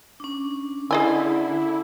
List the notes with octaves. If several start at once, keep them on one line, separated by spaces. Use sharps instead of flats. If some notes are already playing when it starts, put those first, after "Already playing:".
C#4 D4
D3 E4 G#4 D#5 G#5